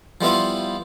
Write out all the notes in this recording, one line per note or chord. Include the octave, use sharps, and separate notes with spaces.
F3 G3 B3 E4 F4